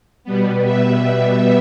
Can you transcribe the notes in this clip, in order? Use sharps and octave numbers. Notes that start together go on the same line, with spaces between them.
B2 G3 B3
E5